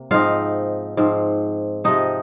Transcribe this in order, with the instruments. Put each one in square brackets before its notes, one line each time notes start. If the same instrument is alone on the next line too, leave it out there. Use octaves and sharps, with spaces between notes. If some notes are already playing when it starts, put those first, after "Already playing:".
Already playing: [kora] C3 A#3
G#2 F3 C4 D#4 F4 F5
G#2 F3 C4
C3 F3 C4 D#4 D#5